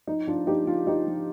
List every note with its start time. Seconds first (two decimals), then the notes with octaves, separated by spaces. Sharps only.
0.07 F3 D#4
0.27 F3 D4 F4
0.47 F3 D#4 G4
0.67 F3 D4 F4
0.87 F3 D#4 G4
1.07 F3